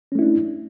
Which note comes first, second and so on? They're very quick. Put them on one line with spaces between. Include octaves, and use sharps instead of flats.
C#4 A3 E4 D4